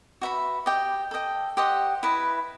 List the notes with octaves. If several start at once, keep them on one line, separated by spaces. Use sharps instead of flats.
F#4 B4 E5 B5
G4 D#5 G5
A4 D#5 G5
G4 C5 D#5 F#5
E4 B4 D#5